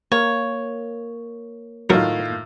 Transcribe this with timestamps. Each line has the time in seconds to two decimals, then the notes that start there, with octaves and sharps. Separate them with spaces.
0.12 A#3 C#5
1.90 A2 D#3 F#3 F4 A#4